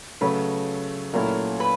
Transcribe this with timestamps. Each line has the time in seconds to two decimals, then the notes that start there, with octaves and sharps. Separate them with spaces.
0.21 C#3 F#3 A3 B4
1.13 A#2 F#3 A3 C#4 E4 A#4
1.60 B4